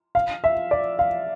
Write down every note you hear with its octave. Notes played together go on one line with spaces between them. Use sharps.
F5
E5
D5
F5